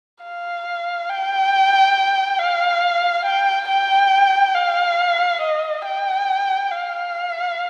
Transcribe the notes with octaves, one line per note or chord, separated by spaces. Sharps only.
F5
G5
F5
G5
G5
F5
D#5
G5
F5